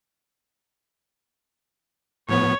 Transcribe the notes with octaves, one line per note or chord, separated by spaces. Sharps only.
A2 F3 B3 C#5